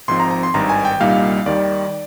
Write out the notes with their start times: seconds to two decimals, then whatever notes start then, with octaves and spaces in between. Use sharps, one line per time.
0.08 G#1 G#2 F3 C4 C6
0.20 A#5
0.31 A#5
0.43 C6
0.54 G#1 G2 D#3 A#5
0.69 G#5
0.85 G5
1.00 C2 A#2 G3 A#3 D#4 F5
1.46 D#2 D#3 G3 D5